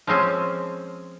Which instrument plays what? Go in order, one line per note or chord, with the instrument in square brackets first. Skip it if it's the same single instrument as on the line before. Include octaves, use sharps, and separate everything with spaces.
[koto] F3 G#3 C4 C#4